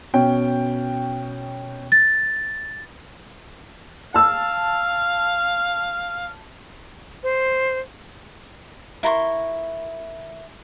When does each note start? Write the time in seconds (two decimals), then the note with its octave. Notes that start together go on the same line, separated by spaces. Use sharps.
0.14 B2 C#4 G5
1.92 A6
4.14 F5 A5 E6
7.23 C5
9.03 E4 A#4 C6 C#6